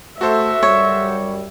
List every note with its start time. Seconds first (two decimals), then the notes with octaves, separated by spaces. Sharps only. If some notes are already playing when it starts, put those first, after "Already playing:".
0.21 A3 F#4 A4 C5 E5
0.63 F#2 G3 C#5